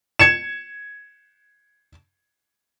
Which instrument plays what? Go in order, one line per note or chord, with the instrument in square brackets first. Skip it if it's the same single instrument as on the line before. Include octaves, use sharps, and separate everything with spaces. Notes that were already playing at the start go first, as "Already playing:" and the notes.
[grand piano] G#6 C#7 E7